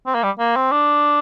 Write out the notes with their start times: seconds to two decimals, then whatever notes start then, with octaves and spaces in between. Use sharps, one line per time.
0.06 C4
0.15 A#3
0.23 G3
0.39 A#3
0.56 C4
0.72 D4